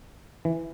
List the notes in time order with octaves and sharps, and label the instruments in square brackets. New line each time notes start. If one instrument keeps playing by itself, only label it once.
[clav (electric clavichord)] E3